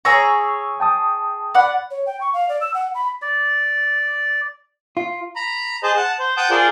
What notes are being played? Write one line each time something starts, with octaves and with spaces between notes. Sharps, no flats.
G#4 C#5 A#5 C#6 E6
G5 A5 D#6
D5 F#5 B5
C#5
G5
C#6
F5
D5
E6
F#5
B5
D5
F4
A#5 B5
G#4 C5 D#5 A5
F#5 A5
C5
F#5 G5 A5 D#6 G6
F4 G#4 A#4 C5 D5